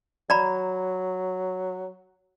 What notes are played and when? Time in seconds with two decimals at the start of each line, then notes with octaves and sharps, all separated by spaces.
0.30 F#3 D5 A#5 B5